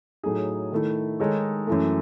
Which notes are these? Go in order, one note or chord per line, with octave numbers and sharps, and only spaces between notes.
A2 F#3 A3 D#4 G#4
D#3 A3 E4
D#3 G#3 D#4 A4 C#5
F#2 E3 A3